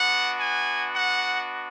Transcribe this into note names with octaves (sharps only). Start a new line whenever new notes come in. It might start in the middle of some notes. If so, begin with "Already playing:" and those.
Already playing: B3 D4 F#4 F#5
G#5
F#5